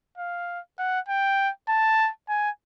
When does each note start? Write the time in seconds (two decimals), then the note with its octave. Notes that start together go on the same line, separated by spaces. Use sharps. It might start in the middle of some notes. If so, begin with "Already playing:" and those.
0.18 F5
0.79 F#5
1.08 G5
1.68 A5
2.29 G#5